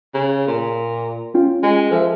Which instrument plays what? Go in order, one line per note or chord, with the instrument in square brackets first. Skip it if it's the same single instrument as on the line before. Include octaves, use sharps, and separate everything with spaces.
[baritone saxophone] C#3
A#2
[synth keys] C#4 F4 G5
[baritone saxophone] G#3
[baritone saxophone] F3 [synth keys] A4 A#4 E5